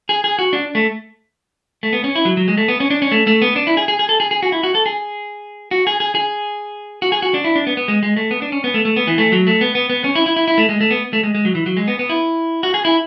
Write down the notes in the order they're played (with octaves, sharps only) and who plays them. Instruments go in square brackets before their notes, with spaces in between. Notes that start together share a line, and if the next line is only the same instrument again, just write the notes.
[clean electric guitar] G#4
G#4
F#4
D4
A3
A3
B3
C#4
E4
F#3
F#3
G#3
A3
B3
C#4
D4
C#4
A3
A3
B3
D4
E4
G#4
G#4
G#4
A4
G#4
G#4
F#4
E4
F#4
A4
G#4
F#4
G#4
G#4
G#4
F#4
G#4
F#4
D4
E4
D4
B3
B3
G#3
G#3
A3
B3
D4
C#4
B3
A3
A3
B3
E3
A3
F#3
A3
B3
B3
B3
C#4
E4
E4
E4
E4
A3
G#3
A3
B3
A3
G#3
G#3
F#3
E3
F#3
G#3
B3
B3
E4
F#4
G#4
E4